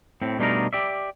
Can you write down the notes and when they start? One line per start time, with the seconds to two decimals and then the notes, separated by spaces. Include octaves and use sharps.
0.22 A2 C4
0.39 B2 G3 A3 D4 D#4 A#4
0.73 G4 D5 E5